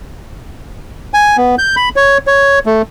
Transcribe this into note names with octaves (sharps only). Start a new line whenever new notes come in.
G#5
B3
G6
B5
C#5
C#5
A3